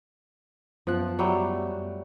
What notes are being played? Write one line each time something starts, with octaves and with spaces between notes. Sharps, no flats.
F#2 F3 B3 F#6
F#3 G3 A3